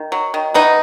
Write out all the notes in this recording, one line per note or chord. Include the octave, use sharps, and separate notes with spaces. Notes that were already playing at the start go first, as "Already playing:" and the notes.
Already playing: D#3
F#3
D#3
E3 B3 D#4